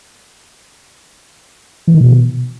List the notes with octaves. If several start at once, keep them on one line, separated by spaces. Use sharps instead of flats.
E3
D#3
B2